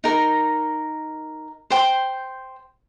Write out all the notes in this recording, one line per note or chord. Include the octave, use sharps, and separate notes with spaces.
D#4 A#4
C5 G5 C6